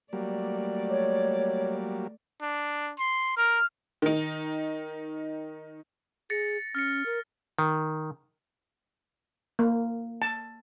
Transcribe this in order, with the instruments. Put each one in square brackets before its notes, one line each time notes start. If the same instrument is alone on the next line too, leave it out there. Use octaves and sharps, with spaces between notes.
[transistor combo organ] F#3 G3 A#3 [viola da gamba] A3 D5
[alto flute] C#5
[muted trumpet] D4
C6
[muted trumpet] A#4 [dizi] F6
[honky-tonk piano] D#3 D#4
[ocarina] G#4 [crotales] A6 A#6 C#7
[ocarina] C#4 [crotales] F6 A6 C#7
[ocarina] A#4
[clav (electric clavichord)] D#3
[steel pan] A#3
A5